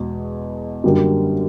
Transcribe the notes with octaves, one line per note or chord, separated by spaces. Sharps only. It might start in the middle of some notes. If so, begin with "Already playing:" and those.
Already playing: E2 B2 G#3
F#2 D3 G3 A#3